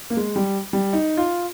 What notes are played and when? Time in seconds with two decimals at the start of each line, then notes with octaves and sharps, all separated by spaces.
0.10 A#3
0.17 G#3
0.36 G3
0.73 G3
0.93 D#4
1.17 F4